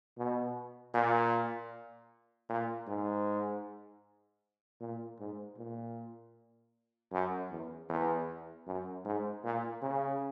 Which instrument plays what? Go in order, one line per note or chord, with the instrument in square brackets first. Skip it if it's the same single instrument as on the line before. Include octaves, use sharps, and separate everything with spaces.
[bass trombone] B2
A#2
A#2
G#2
A#2
G#2
A#2
F#2
E2
E2
F#2
G#2
A#2
C#3